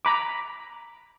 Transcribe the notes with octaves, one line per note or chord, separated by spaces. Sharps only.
A#5 B5 D6